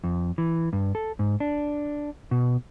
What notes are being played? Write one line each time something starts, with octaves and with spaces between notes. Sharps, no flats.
F2
E3
G2
A4
G#2
D4
B2